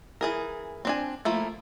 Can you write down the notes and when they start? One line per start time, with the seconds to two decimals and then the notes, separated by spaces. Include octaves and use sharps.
0.21 E3 G#4 A#4
0.85 C4 D4 G#5
1.25 F3 A3 A#3 E4